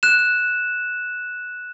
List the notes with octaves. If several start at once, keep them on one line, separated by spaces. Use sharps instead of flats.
F#6 E7